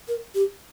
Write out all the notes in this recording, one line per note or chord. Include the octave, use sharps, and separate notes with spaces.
A#4
G4